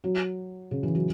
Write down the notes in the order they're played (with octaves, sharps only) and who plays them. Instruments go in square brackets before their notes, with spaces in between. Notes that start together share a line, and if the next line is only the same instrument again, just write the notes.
[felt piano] F#3
C#3
E3
F#3